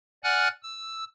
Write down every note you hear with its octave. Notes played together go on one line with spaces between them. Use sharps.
D5 F#5 G#5 F6 F#6
E6